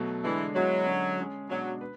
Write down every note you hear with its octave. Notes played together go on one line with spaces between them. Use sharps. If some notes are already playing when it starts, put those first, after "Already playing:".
Already playing: B2 F#3 A3
D3 E3 G#3 D4
F#3 G#3 B3 E4
D3 G#3 C#4
G#3 C#4 G#4
B2 F#3 G#3 D4 F#4
B4